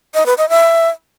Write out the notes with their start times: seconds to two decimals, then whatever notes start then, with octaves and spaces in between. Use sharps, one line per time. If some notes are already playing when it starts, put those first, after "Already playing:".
0.14 D#5
0.26 B4
0.38 D#5
0.49 E5